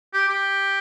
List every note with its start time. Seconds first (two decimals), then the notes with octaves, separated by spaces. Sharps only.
0.13 G4
0.28 G4